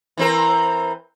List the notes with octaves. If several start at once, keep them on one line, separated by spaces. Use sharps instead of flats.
E3 C4 A#4